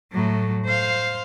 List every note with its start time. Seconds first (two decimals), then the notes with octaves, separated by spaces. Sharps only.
0.12 A2 F#3
0.65 C5 F5